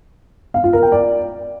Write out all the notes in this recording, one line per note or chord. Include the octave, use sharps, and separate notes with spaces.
F5
F4
A#4
G5
D5